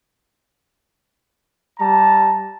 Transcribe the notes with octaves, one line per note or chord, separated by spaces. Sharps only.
G3 A5 A#5